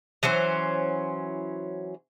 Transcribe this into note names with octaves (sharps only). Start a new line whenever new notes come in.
E3 F#3 C#4 C5